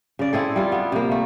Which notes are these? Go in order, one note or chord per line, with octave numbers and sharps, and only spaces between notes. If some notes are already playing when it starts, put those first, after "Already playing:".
C#3 D5
C4 E4 G#4 A4
G3 F4
B3
C3 A#3
A3